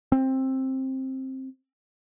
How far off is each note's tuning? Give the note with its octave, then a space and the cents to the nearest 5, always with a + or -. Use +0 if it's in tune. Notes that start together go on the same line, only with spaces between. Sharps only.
C4 +15